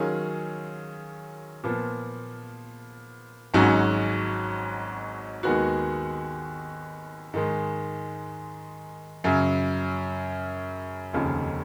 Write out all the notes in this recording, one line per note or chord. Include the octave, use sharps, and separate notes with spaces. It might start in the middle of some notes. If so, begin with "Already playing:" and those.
Already playing: D#3 F#3 C#4 F4 G#4
A#2 F3 B3
G#1 G#2 F#3 C#4 F#4
D#2 D#3 G#3 B3 F#4
G#2 D#3 G#3
F#2 C#3 F#3
F1 D#2 C#3 F3